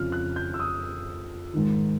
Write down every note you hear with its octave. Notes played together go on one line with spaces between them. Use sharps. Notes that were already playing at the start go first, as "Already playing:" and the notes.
Already playing: F2 C#3 F3 F6
F#6
G6
E6
D#6
G#2 D#3